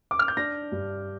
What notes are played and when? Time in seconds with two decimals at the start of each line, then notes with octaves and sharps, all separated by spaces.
0.11 D6
0.19 F6
0.28 G6
0.37 D4 A#6
0.72 G2